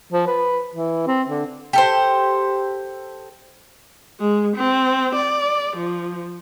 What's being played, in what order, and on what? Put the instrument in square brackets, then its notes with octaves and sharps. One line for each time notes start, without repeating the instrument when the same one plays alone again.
[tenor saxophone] F3
B4
E3
C4
D3
[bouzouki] G4 A4 C5
[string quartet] G#3
C4
D5
F3